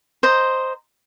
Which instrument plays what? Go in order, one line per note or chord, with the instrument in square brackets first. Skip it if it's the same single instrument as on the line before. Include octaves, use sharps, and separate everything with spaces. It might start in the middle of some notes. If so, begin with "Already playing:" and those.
[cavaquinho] C5 D#5 A#5